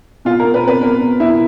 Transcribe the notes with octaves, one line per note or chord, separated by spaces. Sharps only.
B2 F4
A#4
B2
B4
C4 A#4 B4
B2 A#4
B2
B2 E4